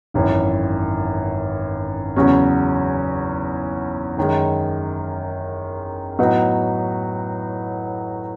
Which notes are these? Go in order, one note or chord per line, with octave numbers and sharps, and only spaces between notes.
G#1 F#2 E3
E2 C#3 F#3 C#4
F#2 D#3 G#3
A2 F#3 B3 D#4 F#4